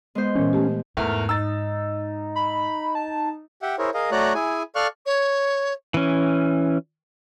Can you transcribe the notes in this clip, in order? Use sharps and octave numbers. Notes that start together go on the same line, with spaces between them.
G#3 B3 C5
A#2 E3 C#4
A3 G4
E2 G#2 A3 A#4 F6
D#4 E6 A6
B5
A5
G4 E5 F#5 G5
E4 G#4 A#4 C5 C#5
G#4 A#4 D#5 F5
A3 F#4 C#5 D5 A#5 F#6
E4 G#4 G#5
A4 D5 F5 C#6 F6 F#6
C#5
E3 C#4